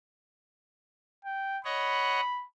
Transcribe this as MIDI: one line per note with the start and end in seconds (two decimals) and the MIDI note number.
1.25 1.59 79
1.65 2.21 73
1.65 2.21 75
1.65 2.21 78
1.65 2.45 83